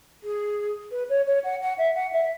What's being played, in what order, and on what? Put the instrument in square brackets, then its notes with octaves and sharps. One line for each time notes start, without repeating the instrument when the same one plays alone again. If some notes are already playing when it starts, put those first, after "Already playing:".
[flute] G#4
B4
C#5
C#5
F#5
F#5
E5
F#5
E5